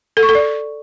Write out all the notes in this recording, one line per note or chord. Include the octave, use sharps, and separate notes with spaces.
A4
C#6
A4
D5